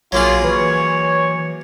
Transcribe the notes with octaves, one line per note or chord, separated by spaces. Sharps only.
A#1 F#3 A#3 F4 G#4
E3 B4 C#5